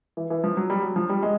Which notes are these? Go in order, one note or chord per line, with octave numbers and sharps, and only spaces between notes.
E3
E3
F3
F#3
G3
F#3
F3
G3
G#3